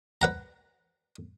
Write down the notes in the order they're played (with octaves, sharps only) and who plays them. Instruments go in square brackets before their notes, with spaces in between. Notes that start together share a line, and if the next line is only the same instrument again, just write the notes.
[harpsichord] B4 F#5 A#5